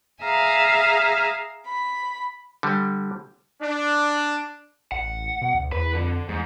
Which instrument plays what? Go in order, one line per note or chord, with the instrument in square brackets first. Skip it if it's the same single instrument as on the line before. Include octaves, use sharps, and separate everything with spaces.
[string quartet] G#4 E5 F5 G#5 A#5
B5
[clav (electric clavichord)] D3 G3
[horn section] D4
[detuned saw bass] A1 [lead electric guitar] F#5
[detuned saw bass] B2
D2
[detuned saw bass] E2 [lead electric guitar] B4
[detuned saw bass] F2 [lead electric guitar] D3
[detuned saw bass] E2 [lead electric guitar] G#2